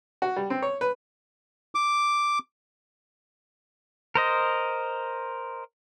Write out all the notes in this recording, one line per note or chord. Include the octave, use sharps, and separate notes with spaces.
F#4
G3
C4
C#5
B4
D6
A#4 C5 D#5